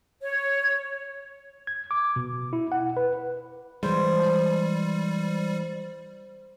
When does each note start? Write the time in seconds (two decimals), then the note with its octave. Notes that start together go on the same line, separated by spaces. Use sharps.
0.22 C#5
1.67 G#6
1.91 D6
2.16 B2
2.53 E4
2.72 F#5
2.97 B4
3.83 E3 G3 G#3 C5